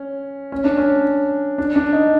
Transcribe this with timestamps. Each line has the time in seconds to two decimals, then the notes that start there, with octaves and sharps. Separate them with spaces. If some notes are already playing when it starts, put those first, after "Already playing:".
Already playing: C#4
0.52 C#4
0.64 D4
0.78 C#4
1.58 D4
1.76 D4
1.93 D#4